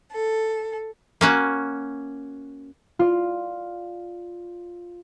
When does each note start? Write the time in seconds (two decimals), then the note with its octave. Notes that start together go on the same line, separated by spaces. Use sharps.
0.11 A4
1.21 A#3 C#4 F#4
2.99 F4 D5